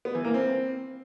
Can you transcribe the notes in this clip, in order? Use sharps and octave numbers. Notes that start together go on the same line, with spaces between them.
B3
E3
A#3
C4